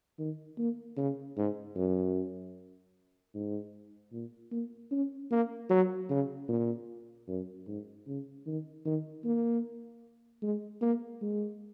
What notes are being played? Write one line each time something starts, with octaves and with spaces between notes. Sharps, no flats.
D#3
A#3
C#3
G#2
F#2
G#2
A#2
A#3
C#4
A#3
F#3
C#3
A#2
F#2
G#2
C#3
D#3
D#3
A#3
G#3
A#3
G#3